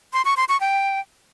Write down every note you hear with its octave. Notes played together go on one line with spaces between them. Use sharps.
C6
C#6
C6
C#6
G5